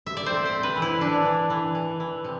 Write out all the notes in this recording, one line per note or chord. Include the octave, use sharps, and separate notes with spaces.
E5
D5
C4 C5
C5
C4
B4
E3
E4
E3 D4
E3
E3
E3
E3
C3